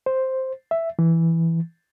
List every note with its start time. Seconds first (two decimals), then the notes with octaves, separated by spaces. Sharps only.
0.06 C5
0.71 E5
0.99 E3